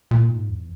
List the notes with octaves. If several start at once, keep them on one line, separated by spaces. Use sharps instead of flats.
A#2
G#2
E2